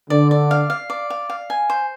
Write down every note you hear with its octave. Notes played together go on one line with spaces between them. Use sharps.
D3 D5
D5
F5
F5
D5
F5
F5
G#5
C5